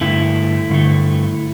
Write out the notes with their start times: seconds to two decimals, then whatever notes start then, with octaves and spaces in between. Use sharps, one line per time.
0.01 G2 D3 A3 E4
0.69 G2 D3 A3